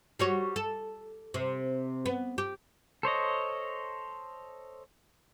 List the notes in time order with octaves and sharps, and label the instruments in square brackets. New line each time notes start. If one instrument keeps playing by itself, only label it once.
[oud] G3 F#4 C#5
A4
C3
B3
G4
[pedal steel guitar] A4 C5 C#5 D#5